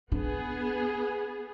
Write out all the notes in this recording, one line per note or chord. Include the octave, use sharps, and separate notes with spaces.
B3 D4 G#4